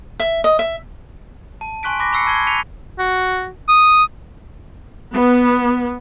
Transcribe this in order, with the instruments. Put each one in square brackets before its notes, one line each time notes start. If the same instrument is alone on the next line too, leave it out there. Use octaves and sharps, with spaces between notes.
[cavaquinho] E5
D#5
E5
[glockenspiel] A5
G#5 C6 C#6 F#6 B6 D7
B5 D6 A#6 B6
B5 C#6 E6 C7 C#7
A5 G#6 C7 G7
B6 C#7 D#7 F7
[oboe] F#4
D#6
[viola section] B3